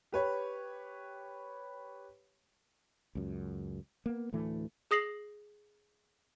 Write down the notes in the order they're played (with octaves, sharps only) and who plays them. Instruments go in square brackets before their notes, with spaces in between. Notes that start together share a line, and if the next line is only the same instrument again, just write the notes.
[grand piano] G4 B4 C#5
[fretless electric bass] C#2 F#2
A#3 B3
D2 A2 E3 A3
[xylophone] G#4 D#6 A#6 C7 F#7